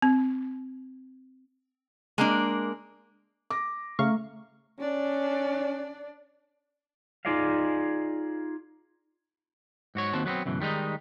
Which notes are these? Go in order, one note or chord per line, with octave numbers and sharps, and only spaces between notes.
C4
G#3 A#3 D4
D6 A#6
C#3 A3 F5 C#6
C#4 D4 D5
D#4 F4 G#4 D5 D#5 F5
G#2 F#4 C#5
D#2 C4 F#4 A5
F#3 A3 B3 C4
C#2 F#2 B2 E3
D#3 G3 G#3 D#4